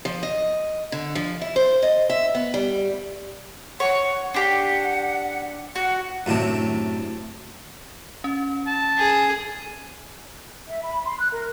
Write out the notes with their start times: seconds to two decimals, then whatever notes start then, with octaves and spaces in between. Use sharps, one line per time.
0.05 F3
0.23 D#5
0.92 D3
1.15 F3
1.41 E4
1.56 C5
1.82 D#5
2.10 E5
2.35 B3
2.54 G3
3.80 C#5 F#5
4.34 D4 G4 F#5
5.75 F#4 F#5
6.26 F#2 A2 C3 D4
8.24 C#4
8.67 A5
8.98 G#4
10.67 E5
10.83 B5
11.04 C6
11.19 F#6
11.32 A#4